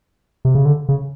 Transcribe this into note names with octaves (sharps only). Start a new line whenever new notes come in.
C3
C#3
D3
C#3